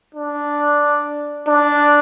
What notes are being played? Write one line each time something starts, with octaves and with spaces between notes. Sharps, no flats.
D4
D4